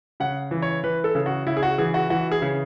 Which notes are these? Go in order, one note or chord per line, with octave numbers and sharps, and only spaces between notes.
C#3 F#5
E3
C#5
E3 B4
A4
C#3
F#4
C#3 E4
G#4
F#4
E3 G#4
F#4
E3 F#4
G#4
C#3